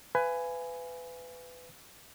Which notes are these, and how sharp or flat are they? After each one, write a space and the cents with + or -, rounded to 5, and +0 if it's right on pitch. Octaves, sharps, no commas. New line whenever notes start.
B4 +20 F5 -40 G#5 +0